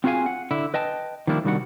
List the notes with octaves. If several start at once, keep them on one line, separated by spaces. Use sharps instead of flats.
C4 F4 F#4 G#4 F5 G#5
F#5
D3 E4
B4 D#5 G5 A5
D#3 F3 G3 A#3 D4 E4
C2 D#3 G3 D4 F#4 F#5